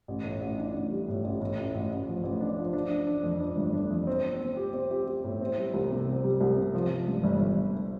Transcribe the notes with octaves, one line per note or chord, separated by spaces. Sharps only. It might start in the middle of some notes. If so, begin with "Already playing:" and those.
A1
A2
A1
D4
A1
G3
A2
A1
A2
A1
A1
A1
F3
A1
D4
F3
D4
D4
D4
F2
D4
G1
D4
F2
C4
C4
C4
G4
C4
G4
G4
A2
C4
G3
C2
C3
C4
G3
C2
C3
F3
F3
G2
G1
G1